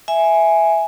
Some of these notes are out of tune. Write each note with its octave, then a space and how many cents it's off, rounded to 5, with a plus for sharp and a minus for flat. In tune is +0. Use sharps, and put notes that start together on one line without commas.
E5 +0 G#5 +0